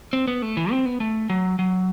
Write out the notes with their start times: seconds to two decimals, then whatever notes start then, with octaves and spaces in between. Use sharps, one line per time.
0.13 C4
0.27 B3
0.42 A3
0.57 E3
0.71 C4
0.86 B3
1.00 A3
1.30 F#3
1.59 F#3